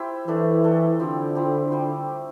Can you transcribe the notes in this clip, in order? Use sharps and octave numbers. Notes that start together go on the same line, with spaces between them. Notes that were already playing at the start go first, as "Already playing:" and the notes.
Already playing: E4 G4 C5 E5
E3 A3 D4 A4
A3 D4 A4
D3 F3 C4 E4 G4
F3 C4 E4 G4
G3 D4 G4 C5